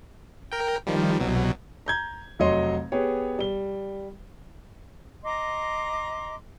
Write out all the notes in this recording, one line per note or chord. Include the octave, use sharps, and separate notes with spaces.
A#4 G5
D#3 F3 G3
C2 B2 F#3
A#5 G6 G#6
F1 F#3 C#5 D#5 C6
B3 G4 G#4 C#5
G3 G7
D#5 A#5 C6 D6